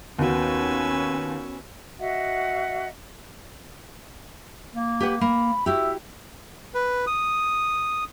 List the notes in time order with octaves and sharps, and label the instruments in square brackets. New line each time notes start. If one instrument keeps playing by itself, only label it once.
[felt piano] D#2 [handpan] B3 F#4 [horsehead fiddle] C#4 [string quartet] B4 G#5 E6
[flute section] F#4 D#5 E5 F#5
[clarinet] A#3
[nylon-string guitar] G4 B4 F#5
[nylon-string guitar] A#3 [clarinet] B5
[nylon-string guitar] E4 F#4 G4 [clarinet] E5
[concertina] B4
D#6